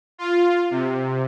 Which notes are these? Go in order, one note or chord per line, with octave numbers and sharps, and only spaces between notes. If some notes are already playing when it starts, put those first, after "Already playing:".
F4
C3